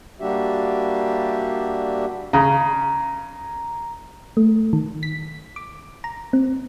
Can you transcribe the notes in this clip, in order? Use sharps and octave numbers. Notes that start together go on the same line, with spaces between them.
G3 A#3 D4 F#4 G4 E5
C#3 A#5
A3
D#3
B6
D6
A#5
C4